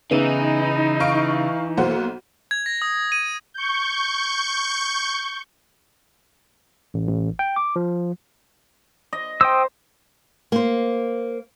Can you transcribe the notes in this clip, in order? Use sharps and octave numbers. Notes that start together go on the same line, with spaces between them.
C#3 E3 B3 D#4 E4 D#7
F5 C#6 D7
B1 A#3 C5 F#5
G#6
A#6
D#6
D#7
C#6 G6
A1
A1
G5
D6
F3
D#5
C5 G5 D#6 E6
A#3 C5